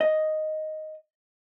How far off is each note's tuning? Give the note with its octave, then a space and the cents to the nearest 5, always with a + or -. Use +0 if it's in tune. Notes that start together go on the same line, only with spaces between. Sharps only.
D#5 +0